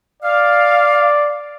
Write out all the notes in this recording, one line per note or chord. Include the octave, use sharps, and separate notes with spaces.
D5 F5